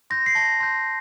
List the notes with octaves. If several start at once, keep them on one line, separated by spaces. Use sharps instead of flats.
C6 G6 A#6
C7
A5 A#6
C6 G6